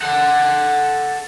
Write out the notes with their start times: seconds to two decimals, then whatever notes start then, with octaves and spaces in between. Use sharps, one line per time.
0.02 A4 F#5